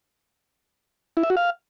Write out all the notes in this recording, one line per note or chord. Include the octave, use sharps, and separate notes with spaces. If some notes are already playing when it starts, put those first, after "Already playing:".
E4
E5
F#4
F5